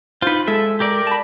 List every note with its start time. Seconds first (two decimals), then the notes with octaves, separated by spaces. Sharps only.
0.22 D#4 F4 B4 C5
0.48 G#3 A4 E5
0.80 G4 A#4 D5
1.07 A5 B5